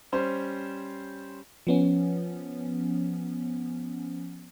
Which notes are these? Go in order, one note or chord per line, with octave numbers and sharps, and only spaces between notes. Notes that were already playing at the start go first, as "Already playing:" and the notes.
G3 C#4 C5
F3 B3 C#4